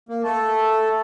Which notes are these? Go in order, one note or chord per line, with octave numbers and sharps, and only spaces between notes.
A#3
A3 A4